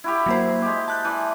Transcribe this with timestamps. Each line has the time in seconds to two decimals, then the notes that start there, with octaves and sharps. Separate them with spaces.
0.04 E4 F#4 G4
0.26 F#3 A#3 C5
0.62 G#3 G4
0.88 A5 F#6 G6
1.05 E3 D5